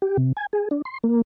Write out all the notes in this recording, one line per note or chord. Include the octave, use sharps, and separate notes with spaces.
G4
C3
G#5
G#4
D4
C6
A#3